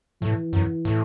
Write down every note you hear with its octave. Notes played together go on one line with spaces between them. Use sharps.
A2 E3
F#2
A2